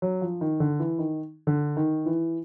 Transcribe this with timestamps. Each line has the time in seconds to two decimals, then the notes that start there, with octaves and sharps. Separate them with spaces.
0.02 F#3
0.21 F3
0.41 D#3
0.60 D3
0.80 E3
0.99 D#3
1.47 D3
1.77 D#3
2.06 E3